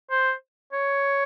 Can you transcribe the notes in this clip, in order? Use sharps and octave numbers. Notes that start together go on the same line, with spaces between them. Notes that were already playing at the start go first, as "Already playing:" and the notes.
C5
C#5